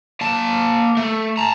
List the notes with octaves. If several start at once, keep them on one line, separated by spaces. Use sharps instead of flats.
A#3 A5
A3
A5 A#5